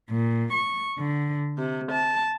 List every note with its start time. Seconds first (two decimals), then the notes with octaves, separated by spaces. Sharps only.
0.11 A#2
0.54 C#6
0.99 D3
1.56 C3
1.90 A5